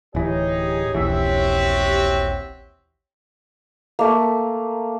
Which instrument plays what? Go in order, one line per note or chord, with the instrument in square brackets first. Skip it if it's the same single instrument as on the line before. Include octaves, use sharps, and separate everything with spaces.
[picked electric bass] D1 E3 [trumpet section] D#4 G#4 [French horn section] G4 C#5
[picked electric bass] D#1 A#1 E3 [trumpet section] C4 F#4 E5
[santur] A3 A#3